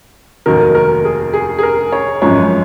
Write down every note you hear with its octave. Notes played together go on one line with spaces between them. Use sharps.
F1 D#2 D#3 F#3 A#4
A#4
G#4
G#4
G#4
A#4
C#5
G#1 F#2 F3 G#3 C#5